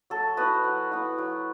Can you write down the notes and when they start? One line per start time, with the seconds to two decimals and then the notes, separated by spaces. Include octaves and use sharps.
0.10 F#3 A4
0.37 B3 E4 F#4 B4
0.64 F#3
0.91 B3 E4
1.18 F#3